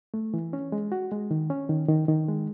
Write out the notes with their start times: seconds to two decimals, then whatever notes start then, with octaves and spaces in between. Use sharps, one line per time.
0.14 A3
0.34 E3
0.53 C#4
0.72 G#3
0.92 F#4
1.12 G#3
1.31 D#3
1.50 C#4
1.69 D#3
1.88 D#3
2.08 D#3
2.28 G#3